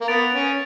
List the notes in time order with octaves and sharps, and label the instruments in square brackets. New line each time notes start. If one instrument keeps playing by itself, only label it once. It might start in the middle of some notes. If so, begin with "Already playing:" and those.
[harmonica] A#3
[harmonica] B3 [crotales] A6 D7 F7
[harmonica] C#4